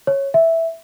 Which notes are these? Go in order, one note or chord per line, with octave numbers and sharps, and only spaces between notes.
C#5
E5